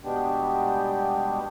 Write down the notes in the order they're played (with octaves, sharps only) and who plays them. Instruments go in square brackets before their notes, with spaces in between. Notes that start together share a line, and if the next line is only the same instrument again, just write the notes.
[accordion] B2 G3 G#3 B3 D4 G4